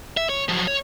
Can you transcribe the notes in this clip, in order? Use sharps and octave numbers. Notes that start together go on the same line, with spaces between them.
E5
C#5
F3 F#3
C#5